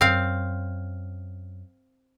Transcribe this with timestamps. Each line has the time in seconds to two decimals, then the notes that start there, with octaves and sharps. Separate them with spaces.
0.01 F#2 C4 F5